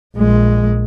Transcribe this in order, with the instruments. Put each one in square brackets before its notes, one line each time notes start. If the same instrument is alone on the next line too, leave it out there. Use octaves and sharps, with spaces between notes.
[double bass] A#1 G#3